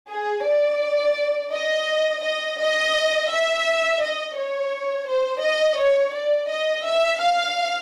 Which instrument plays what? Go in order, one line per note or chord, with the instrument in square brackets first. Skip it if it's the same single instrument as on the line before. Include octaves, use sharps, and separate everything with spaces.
[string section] G#4
D5
D#5
D#5
D#5
E5
D#5
C#5
C5
D#5
C#5
D5
D#5
E5
F5